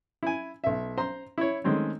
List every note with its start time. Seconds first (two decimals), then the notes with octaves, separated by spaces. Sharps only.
0.23 E4 G#5
0.64 B1 E5
0.98 C5 A#5 C6
1.38 E4 C#5
1.64 D#3 G#3 A3 C4 C#4